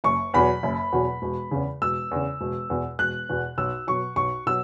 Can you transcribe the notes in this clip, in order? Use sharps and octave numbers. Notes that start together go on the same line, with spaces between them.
F#1 C#6
E2 B2 F#3 B5
F#1
E2 B2 F#3
E1
E2 C#3
E1 E6
E2 C#3
E1
E2 B2
E1 F#6
E2 B2
B1 E6
B2 F#3 C#6
B1 C#6
B2 F#3 E6